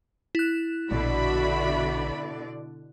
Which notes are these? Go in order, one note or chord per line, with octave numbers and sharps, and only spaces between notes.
E4 F#6
A#1 B2 D3 F#4 D5 E5 B5